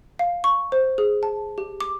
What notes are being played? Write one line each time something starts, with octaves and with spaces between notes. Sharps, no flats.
F5
C#6
C5
G#4
A5
G4
D6